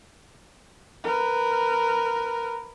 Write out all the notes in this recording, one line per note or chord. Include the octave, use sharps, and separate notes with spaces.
A#4 B4